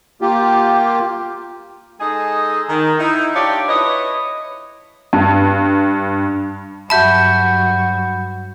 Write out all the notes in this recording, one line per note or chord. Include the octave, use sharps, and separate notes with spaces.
A#3 F4 G4
G#3 D#4 G#4 A4 D#5
D#3
D#4 E4
D4 F4 G4 C#5 D5
E4 B4 C#5 D#5
G2
G2 F#3 F#4 E5 A5 B5 G6